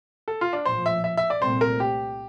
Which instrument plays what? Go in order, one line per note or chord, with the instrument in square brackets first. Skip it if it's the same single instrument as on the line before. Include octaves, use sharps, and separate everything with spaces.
[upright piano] A4
F4
D4
[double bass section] A#1 A2 F3 [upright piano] C5
[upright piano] E5
E5
E5
D5
[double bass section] C2 A#2 A3 C4 [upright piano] C5
[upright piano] A#4
G4